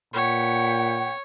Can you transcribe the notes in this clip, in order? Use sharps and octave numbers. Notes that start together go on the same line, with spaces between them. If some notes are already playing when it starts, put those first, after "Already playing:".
A#2 B4 C#5 F#5 G5